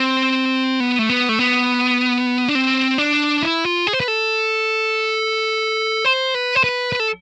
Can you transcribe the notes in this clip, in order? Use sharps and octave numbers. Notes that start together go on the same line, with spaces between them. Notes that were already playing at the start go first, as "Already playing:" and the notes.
Already playing: C4
B3
A3
B3
A3
B3
D4
C4
D4
E4
F4
G#4
C5
B4
A4
C5
B4
C5
B4
B4
A4